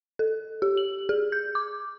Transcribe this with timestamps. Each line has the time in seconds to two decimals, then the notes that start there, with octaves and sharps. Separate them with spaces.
0.19 A4
0.62 G4
0.77 F#7
1.09 G#4
1.32 G6
1.55 D6